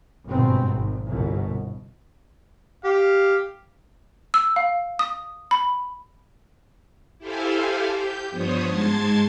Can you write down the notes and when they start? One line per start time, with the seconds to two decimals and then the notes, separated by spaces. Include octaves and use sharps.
0.28 G1 G#2 B2 C4
0.73 G#1
1.06 G1 C2 B2
2.85 G4 F5
4.34 E6
4.56 F5
4.99 D#6
5.51 B5
7.19 E4 G4 A4 C5 F5 G#5
7.87 G4 G6
8.30 G2 F3 B3 C5 C#5 D#6
8.67 G#2 G#3 A5 C6 G#6 A6